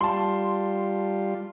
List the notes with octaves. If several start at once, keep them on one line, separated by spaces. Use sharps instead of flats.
G3 F4 A5 C6